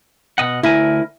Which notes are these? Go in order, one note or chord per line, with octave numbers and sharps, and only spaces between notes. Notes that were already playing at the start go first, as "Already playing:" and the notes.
B2 D#5 F#5
D2 E4 A#4 G#5